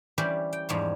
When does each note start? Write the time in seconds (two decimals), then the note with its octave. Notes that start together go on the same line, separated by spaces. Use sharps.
0.18 E3 G3 C#4 G4 C5 D5
0.53 G5
0.69 E2 G#2 F3 G3 C#5